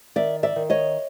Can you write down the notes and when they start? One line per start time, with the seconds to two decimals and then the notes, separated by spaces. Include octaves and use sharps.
0.16 D#3 D5 E5
0.43 D5 E5
0.56 D#3
0.70 C#5 D#5